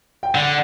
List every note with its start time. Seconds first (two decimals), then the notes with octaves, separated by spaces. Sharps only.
0.23 G5
0.34 D3 F#5